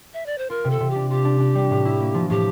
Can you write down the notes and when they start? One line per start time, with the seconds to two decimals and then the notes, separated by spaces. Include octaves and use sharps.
0.14 E5
0.26 D5
0.38 C5
0.50 F4 A#4
0.64 C3
0.70 A4
0.80 C3
0.90 G4
0.96 D4
1.10 F4 G4
1.25 D4
1.40 D4
1.55 G3
1.71 A2
1.85 E4
2.00 A#3
2.14 F3
2.30 A2 G4